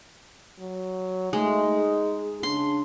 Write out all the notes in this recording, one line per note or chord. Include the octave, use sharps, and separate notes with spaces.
F#3
G#3 A3 D#4
G#4
C#3 D4 C6